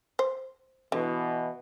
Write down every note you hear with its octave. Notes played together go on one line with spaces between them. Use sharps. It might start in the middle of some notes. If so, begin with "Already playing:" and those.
C5
B2 D3 E3